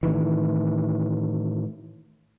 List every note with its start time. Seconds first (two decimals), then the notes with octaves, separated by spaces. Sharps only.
0.03 A2 D#3 E3